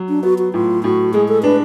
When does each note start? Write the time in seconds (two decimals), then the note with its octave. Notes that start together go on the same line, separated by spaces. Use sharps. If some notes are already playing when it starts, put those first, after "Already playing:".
Already playing: F#3
0.09 D4
0.23 B3 F#4
0.38 F#4
0.54 A2 F4
0.84 A2 F#4
1.14 G#3 G#4
1.28 A4
1.43 D4 B4